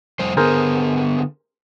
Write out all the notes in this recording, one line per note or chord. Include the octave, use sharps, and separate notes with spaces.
F2 G3 C5
D3 B3 G#4 A#4 C5